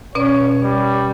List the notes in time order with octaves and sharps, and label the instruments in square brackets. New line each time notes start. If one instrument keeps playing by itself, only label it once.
[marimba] B2 C#4 D5 [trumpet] C#5
[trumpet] G3